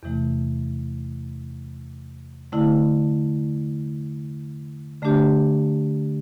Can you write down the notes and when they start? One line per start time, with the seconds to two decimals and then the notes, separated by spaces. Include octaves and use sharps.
0.03 E2 C3 E3 A3
2.52 D3 A3 E4
5.02 D3 A3 D4 G4